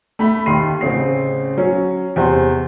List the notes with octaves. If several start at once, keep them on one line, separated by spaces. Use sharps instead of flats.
A3 B5
D#2 D#3 C6 C7 D#7
A1 C#3 C4 C7
F#3 C#4 C#5
E2 C3 C5